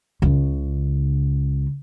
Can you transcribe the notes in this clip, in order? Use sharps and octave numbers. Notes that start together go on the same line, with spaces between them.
C#2 C#3